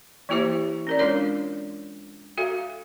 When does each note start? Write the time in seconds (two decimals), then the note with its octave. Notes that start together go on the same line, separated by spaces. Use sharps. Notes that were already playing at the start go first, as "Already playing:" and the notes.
0.29 E3 A#3 E4 G4 C5 E5
0.87 C#4 A#4 D5
0.99 G#3 D4 F4 A#4 C#5 D5
2.38 F#4 A4 E5 F5